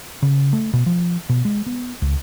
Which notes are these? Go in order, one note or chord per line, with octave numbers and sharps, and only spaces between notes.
C#3
A3
B2
F3
B2
G#3
B3
C#2